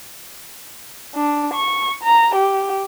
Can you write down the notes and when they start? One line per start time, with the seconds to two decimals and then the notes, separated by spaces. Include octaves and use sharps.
1.15 D4
1.54 C#6
2.03 A#5
2.35 G4